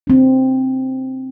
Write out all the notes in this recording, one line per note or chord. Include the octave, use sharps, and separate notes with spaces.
C4 D4